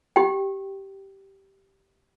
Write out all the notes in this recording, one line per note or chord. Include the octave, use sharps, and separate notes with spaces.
G4 G5